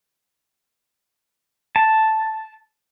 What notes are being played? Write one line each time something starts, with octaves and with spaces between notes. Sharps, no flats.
A5